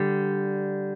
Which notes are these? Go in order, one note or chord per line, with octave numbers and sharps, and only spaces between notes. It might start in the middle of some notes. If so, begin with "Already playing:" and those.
Already playing: D3 G3